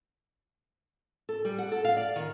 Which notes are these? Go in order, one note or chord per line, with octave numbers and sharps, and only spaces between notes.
A4
G3
F#5
A4
F5
D5
D#3